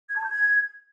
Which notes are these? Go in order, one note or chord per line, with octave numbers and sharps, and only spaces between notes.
G#6
A5
G6
G#6